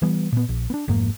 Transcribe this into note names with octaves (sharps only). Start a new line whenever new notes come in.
E3 G3 B3
A#2 B3
A#1
B3 D4
F1 F2 G#2 A#3